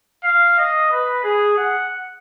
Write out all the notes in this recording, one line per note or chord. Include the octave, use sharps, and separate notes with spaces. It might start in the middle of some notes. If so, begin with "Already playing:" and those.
F5
D#5
B4
G#4
F#5